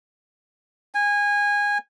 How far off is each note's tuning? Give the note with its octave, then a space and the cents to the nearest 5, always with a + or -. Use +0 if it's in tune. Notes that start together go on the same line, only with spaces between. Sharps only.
G#5 -20